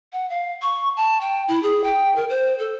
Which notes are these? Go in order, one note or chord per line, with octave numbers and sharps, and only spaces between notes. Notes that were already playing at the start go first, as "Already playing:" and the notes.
F#5
F5
C#6
A5
G5
E4
G#4
G5
A#4
C5
A4